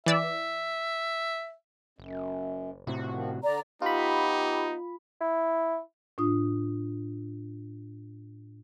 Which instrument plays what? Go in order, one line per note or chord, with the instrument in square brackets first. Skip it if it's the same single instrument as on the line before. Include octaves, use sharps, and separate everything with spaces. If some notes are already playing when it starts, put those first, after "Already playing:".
[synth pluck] E3 D5 E6 [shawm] E5
[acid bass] F#1 [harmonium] F#2
[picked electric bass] A2 C3 [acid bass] F#4
[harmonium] D#3 F3
[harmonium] D3 [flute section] D5 A#5
[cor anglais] B3 [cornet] D#4 [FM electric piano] F4 B5 [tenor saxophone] G4
[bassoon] E4
[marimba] A2 D4 F4 D#6